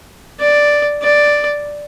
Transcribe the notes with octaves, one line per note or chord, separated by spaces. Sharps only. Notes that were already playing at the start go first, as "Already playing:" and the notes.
D5
D5